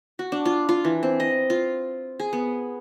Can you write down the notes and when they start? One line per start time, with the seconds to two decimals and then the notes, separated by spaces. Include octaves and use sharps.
0.19 F#4
0.32 D4
0.45 F4
0.69 F4
0.85 E3
1.03 C4
1.20 D#5
1.50 F4
2.20 G#4
2.33 B3